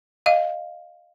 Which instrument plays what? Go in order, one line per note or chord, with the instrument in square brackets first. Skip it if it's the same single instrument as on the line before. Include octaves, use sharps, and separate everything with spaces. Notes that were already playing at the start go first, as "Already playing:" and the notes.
[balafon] D#5 F5